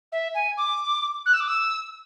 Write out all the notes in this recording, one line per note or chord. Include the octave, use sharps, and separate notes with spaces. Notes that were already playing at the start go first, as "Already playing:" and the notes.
E5
G#5
D6
F#6
E6
D6
E6